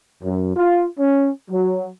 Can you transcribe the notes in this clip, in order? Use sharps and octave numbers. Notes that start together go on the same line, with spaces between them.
F#2
F4
C#4
F#3